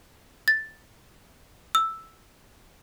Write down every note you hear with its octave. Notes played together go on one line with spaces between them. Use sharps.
A6
E6